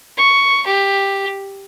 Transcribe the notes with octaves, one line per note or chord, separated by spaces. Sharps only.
C#6
G4